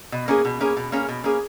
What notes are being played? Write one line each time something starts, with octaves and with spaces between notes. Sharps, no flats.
B2
A#3 C#4 G#4
B2
A#3 C#4 G#4
B2
A#3 C#4 G#4
B2
A#3 C#4 G#4